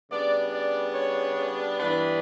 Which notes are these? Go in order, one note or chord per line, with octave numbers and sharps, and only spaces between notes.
C#3 G3 B3 D4 D5
D5
C#5
G2 E3 B3 D4 B4